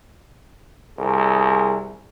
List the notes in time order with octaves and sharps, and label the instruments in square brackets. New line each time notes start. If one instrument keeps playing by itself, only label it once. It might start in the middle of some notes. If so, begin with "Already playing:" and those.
[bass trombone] C2 [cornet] G#4